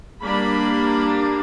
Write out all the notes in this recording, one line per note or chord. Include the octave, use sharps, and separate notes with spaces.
G3 A#3 D4 B5